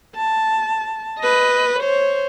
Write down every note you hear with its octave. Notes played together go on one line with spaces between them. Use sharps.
A5
B4 D#5
C5 C#5